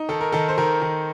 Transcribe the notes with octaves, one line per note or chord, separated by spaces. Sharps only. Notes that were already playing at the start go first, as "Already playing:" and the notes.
Already playing: D#4
D#3 A4
A#4
D#3 A4
C5
D#3 A#4
D#3